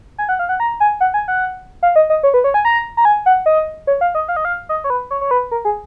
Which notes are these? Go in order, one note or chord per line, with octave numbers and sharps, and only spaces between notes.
G#5
F#5
F5
F#5
A#5
G#5
F#5
G#5
F#5
F5
D#5
D#5
C#5
B4
C#5
G#5
A#5
A#5
G#5
F#5
D#5
C#5
F5
D#5
F5
D#5
F5
D#5
C#5
B4
C#5
C#5
B4
A#4
G#4